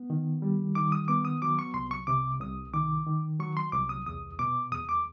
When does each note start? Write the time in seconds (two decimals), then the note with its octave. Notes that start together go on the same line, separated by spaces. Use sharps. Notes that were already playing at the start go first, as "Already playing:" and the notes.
Already playing: B3
0.10 D#3
0.42 G3
0.75 D#3 D6
0.92 D#6
1.08 B3 D6
1.25 D#6
1.42 F#3 D6
1.59 C#6
1.74 C2 C6
1.91 C#6
2.07 C3 D6
2.40 C2 D#6
2.74 D#3 D6
3.06 D#3
3.39 F#3 C#6
3.57 C6
3.72 C2 D6
3.89 D#6
4.06 E2 D#6
4.39 B2 D6
4.72 E2 D#6
4.89 D6